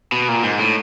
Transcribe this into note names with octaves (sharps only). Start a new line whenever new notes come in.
B2
A#2
G#2
A2